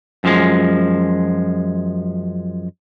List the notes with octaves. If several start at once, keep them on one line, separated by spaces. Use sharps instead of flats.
F#2 F3 G#3